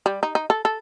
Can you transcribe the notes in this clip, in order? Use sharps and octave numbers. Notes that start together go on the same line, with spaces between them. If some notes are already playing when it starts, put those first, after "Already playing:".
G3
D#4
D#4
A4
A4